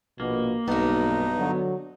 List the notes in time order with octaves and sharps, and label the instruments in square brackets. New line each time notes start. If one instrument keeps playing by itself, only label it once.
[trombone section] A#1 B2 [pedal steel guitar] A#3
[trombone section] B1 [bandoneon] G2 D#4 [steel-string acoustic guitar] B3 F#4
[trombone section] D3 F#3